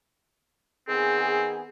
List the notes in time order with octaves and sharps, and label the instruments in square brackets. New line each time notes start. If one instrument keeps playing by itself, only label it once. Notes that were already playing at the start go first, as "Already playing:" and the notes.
[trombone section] D#3 B3 G#4 [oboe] C4